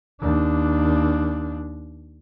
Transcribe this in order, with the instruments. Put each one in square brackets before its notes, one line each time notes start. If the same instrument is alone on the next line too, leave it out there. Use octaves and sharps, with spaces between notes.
[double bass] D#2 D4